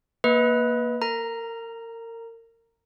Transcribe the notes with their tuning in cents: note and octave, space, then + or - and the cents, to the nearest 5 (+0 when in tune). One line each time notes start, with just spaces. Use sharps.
A#3 +10 B4 -5 D#5 +35
A#4 -30 A#5 +0